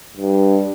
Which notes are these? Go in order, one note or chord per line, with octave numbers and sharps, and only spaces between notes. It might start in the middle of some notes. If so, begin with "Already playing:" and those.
G2